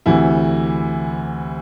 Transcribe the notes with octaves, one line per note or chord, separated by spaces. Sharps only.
D2 C3 E3 E4